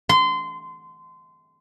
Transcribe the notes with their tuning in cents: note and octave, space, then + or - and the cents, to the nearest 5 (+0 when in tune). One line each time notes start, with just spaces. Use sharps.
C6 -25